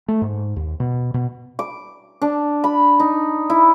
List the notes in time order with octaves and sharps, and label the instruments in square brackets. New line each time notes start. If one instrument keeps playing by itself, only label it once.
[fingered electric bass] A3
G#2
D#2
B2
B2
[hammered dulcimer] D6
D4
B5
D#4
E4